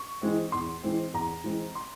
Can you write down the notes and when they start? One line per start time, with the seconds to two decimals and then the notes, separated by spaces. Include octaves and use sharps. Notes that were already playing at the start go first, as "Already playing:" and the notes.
Already playing: C#6
0.22 E3 G#3 C4
0.52 E2 C6
0.84 E3 G#3 C4
1.13 E2 A#5
1.44 E3 G#3 C4
1.75 C6